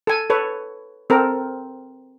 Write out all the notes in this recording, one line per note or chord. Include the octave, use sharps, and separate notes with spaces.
A4 G#5
A4 B4 C#5
C4 A4 A#4